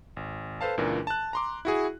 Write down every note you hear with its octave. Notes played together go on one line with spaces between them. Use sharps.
G#1
A4 B4 C5 F5 A5
C#2 A#2 E3 D4 A#4
A5 F#6
A#5 C6 D6
E4 F#4 G#4